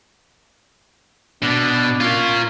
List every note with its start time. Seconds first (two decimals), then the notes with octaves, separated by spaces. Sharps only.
1.42 B2 D4
2.01 C#4 F4 A#4